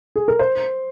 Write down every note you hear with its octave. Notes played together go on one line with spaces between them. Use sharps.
G#4
A#4
C5